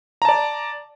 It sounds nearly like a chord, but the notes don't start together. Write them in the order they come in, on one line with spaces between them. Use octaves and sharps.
A#5 A5 D5